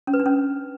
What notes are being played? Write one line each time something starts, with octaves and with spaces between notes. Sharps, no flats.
C#4
B4
D4
C#4